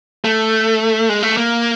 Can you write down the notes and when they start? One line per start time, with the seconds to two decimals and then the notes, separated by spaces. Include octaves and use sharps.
0.24 A3
1.09 G#3
1.23 A3
1.37 A#3